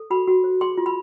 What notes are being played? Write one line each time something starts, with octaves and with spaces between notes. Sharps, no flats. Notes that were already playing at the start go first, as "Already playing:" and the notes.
Already playing: A4
F#4 B5
F#4
C5
G#4 C6
F4
B5